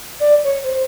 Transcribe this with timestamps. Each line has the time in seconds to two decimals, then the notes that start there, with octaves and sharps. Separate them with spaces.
0.20 D5
0.44 C#5
0.63 C5